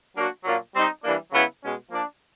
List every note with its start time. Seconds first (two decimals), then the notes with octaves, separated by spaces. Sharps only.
0.15 F#3 A#3 D4 F#4
0.45 A#2 F#3 A#3 D4 F4
0.74 G3 C4 D#4
1.03 E3 G3 A#3 D4
1.32 C#3 F#3 B3 E4
1.61 B2 G#3 C#4
1.90 F3 A#3 D4